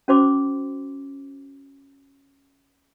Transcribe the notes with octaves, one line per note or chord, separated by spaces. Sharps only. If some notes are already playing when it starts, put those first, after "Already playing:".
C#4 F#4 C5 C6 D6